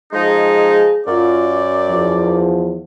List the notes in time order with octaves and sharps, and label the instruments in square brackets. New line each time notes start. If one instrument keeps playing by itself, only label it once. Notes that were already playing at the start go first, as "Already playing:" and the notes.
[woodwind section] F3 G#3 D#4 [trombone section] G#4
[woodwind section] F#2 D5 [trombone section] F4
[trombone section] E2 F3